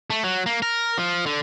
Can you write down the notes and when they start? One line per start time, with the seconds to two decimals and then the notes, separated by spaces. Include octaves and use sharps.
0.10 A3
0.24 F#3
0.46 A#3
0.62 A#4
0.98 F3
1.26 D3